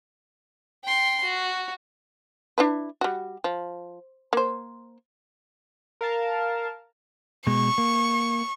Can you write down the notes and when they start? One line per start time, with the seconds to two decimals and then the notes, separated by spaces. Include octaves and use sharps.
0.84 G5 C6
1.24 F#4
2.58 D4 E4 B4
3.01 G3 F#4
3.44 F3
4.33 A#3 C5
6.01 A#4 F5 A5
7.47 B2 G#3 C#6
7.78 A#3